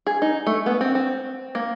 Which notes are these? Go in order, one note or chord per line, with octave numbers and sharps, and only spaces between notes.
G#4
D#4
A3
B3
C4
C4
A#3